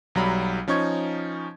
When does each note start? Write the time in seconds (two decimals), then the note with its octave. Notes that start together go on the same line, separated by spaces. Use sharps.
0.15 B1 F#3 G3 A#5 B5
0.68 F3 C#4 D#4 C#6 G#6